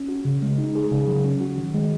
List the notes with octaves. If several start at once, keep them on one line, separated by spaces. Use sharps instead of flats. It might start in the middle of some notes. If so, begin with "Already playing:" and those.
Already playing: C#4
F#4
C#3
G#3
D#4
G#4
C#3
F#3
C#4
F#4
D#3
G#3